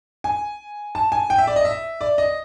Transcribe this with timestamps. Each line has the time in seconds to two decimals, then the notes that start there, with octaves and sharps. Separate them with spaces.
0.24 G#5
0.95 A5
1.12 G#5
1.30 G5
1.38 E5
1.47 D5
1.56 D#5
1.65 E5
2.01 D5
2.18 D#5